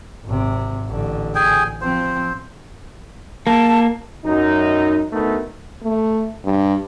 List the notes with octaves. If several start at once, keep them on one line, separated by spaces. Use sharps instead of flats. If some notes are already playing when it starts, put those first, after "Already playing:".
G#1 C3
A1 D3
G#4 G5 G#5
F3 C4 C5
A#3 A5
F#2 D#4
D2 A3 B3 D#4 A#4
A3
G2